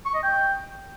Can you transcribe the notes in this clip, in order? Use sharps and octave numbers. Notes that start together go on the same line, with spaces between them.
C#6
D#5
G5